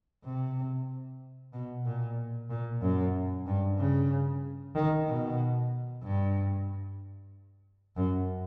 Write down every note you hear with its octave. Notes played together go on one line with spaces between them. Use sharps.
C3
B2
A#2
A#2
F#2
G2
C#3
D#3
B2
G2
F#2